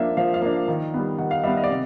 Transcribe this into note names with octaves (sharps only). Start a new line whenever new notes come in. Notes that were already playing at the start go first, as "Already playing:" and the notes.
Already playing: F3 A#3 D4 E5
F3 F5
F5
A#3 D4
D#3
G3 B3
D#3 F#5
F5
G3 B3 E5
D#5
D5
C3 D#5